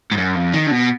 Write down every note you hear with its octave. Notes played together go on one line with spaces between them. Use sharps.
G#2
F#2
F2
D#3
D3
B2